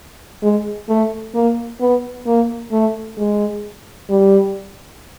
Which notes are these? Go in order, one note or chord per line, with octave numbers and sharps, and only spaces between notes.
G#3
A3
A#3
B3
A#3
A3
G#3
G3